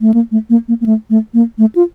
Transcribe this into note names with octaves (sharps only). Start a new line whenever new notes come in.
A3
A#3
A3
A#3
A#3
A#3
A3
A3
A#3
A3
F4